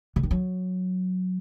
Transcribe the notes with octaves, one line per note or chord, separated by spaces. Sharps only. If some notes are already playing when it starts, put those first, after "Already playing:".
D3
D#3
F#3